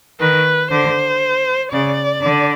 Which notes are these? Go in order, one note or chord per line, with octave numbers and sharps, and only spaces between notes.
D#3 B4
D3 C5
C#3 D5
D3